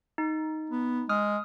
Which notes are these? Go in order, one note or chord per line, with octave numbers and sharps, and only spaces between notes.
D#4
B3
G#3 D#6 F6